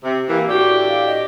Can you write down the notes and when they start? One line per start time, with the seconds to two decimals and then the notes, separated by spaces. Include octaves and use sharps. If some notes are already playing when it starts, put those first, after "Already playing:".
0.04 C3
0.28 E3 A#3 G4
0.48 A2 D4 F#4 G4
0.88 F5
1.07 D#5